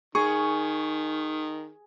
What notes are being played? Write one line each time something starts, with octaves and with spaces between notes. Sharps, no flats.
D#3 G#4 C#6